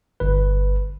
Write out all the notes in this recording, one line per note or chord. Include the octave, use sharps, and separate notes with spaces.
G1 B4